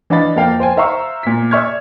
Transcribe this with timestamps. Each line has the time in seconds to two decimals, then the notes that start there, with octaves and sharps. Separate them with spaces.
0.10 E3 D4 D#5 F5 B5 A6
0.36 F2 A#3 F5 G5
0.60 C5 G5 G#5
0.77 C5 E5 F5 A#5 C#6
1.23 A#2 B6
1.51 D5 E5 C#6 F6 G#6